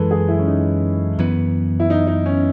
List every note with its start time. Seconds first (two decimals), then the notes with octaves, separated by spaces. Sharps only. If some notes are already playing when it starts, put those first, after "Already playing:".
Already playing: F#2 E3 G#3 A4 B4
0.11 G#4
0.28 E4
0.39 C#4
0.47 D#4
1.19 F#2 E3 B3
1.80 E4
1.90 D#4
2.07 D#4
2.26 C#4